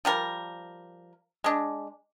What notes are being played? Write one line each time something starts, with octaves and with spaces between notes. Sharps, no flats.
F3 G3 A#4
G#3 D4